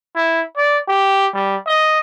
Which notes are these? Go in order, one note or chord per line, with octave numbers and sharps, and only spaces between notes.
E4
D5
G4
G3
D#5